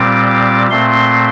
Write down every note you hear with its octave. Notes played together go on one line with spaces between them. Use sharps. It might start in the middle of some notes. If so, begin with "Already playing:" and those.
Already playing: A#2 G3 C4 D6
A#2 A3 C4 C6